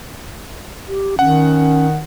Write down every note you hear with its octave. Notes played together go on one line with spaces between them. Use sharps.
G4
D#3 C#4 F#5